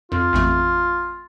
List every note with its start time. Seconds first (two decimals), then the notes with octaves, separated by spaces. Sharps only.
0.12 F2 F4
0.33 A1 F2 A3